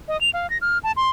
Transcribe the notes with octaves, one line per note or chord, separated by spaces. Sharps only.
D#5
F7
F5
A#6
F6
A5
C6